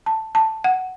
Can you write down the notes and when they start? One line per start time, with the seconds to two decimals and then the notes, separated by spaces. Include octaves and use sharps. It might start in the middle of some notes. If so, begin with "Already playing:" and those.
0.06 A5
0.35 A5
0.64 F#5